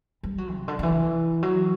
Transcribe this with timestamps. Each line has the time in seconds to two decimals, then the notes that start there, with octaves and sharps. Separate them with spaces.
0.23 G3
0.38 F#3
0.53 C3
0.68 D3
0.79 D3
0.83 E3
1.43 F#3